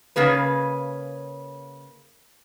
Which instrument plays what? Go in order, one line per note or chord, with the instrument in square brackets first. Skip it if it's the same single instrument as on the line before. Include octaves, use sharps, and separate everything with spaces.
[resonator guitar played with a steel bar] C#3 A#3 G#4 B4